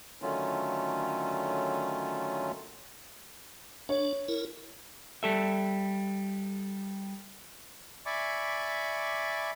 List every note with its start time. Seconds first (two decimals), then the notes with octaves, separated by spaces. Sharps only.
0.22 D3 D#3 F#3 A3 C#4 F4
3.89 D4 C#5
4.28 E4 A#4
5.23 G3 A4 E5
8.06 D5 E5 G#5 B5 C#6 D6